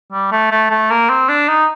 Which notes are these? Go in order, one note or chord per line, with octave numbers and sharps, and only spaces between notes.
G3
A3
A3
A3
A#3
C4
D4
D#4